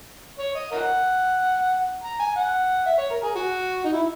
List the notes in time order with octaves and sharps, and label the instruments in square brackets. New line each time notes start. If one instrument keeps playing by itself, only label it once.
[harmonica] C#5
D#5
A#4 D#5 F#5
A#5
G#5
F#5
E5
C#5
A#4
G#4
F#4
D#4
E4